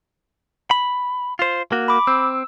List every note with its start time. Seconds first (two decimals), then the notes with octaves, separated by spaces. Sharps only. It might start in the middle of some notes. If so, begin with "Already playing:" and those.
0.71 B5
1.39 F4 C5
1.72 A#3 F#4
1.88 B5 D6
2.07 C4 E6